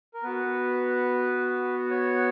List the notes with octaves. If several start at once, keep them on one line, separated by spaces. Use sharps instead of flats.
A#4
B3 F#4 B4
C#5